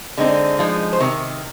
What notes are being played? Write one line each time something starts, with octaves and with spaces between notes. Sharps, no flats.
D3 G#3 C4 D#4
F3 G#3 D#4
C5
C3 D#3